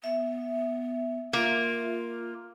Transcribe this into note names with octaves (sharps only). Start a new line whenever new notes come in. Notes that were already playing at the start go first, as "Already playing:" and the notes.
B3 E5
A#3 F4